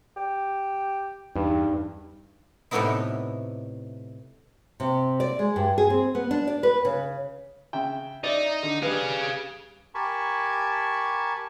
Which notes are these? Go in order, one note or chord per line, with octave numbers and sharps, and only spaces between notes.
G4
E2 G2 D#4
A2 C3 A3 B3 D#4 E4
C3
D5
G#3
G2
G#4
C4
B3
D4
D5
B4
C#3
C#3 E5 G5
D#4 D5 E5
D3
G3 G#4 B4 F5
G4 A#4 G#5 A5 B5 C#6